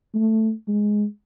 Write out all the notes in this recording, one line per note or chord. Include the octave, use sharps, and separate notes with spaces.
A3
G#3